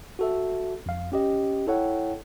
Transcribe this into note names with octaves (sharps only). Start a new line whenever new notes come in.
F#4 A4 E5
F2 F5
C#4 G4 D#5
E4 A4 C#5 F#5 G5